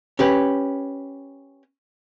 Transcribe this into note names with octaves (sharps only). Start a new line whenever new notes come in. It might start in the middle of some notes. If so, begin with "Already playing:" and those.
C#4 G4 B4